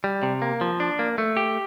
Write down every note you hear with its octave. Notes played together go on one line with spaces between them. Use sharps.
G3
C3
A#3
F3
D4
A#3
A3
G4